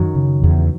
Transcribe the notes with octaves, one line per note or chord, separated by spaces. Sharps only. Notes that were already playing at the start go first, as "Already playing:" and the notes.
Already playing: F#2 D#3 F#3
C#3
E2